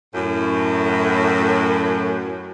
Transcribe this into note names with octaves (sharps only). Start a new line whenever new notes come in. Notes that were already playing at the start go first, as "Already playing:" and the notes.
F#2 A2